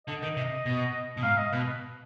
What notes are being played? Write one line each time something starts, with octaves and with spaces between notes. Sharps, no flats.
D3 D#5
D#3
C3
B2
B2
G#2 F5
D#5
B2 B4